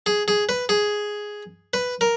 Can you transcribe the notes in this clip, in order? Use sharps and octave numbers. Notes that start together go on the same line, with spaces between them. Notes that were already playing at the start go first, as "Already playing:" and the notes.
G#4
G#4
B4
G#4
B4
A#4